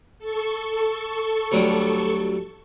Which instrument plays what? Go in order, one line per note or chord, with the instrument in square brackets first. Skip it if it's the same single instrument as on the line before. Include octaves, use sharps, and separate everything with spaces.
[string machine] A4 C#6
[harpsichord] D2 F#3 G3